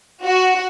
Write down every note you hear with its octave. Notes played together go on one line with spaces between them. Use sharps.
F#4